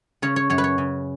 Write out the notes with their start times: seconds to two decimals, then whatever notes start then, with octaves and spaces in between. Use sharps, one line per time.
0.22 C#3 C#5
0.36 C#5
0.50 F#2 C#5
0.58 B4
0.64 C#5
0.78 C#3